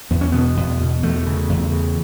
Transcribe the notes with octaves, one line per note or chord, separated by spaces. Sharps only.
E2 B3
C#4
B2 B3
E2
B2
E2 A3
C#3
E2
C#3